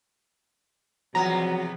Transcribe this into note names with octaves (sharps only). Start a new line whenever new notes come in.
E2 C3 F3 F#3 B3 A#5